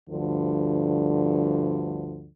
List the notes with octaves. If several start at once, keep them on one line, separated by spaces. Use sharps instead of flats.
D2 G2 D3 F3